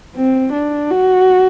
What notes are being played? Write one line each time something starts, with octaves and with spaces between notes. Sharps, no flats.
C4
D4
F#4